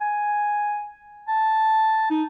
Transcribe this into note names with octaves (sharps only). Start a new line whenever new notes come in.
G#5
A5
D#4